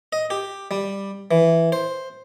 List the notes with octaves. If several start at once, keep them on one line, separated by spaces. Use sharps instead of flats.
D#5
G4
G3
E3
C5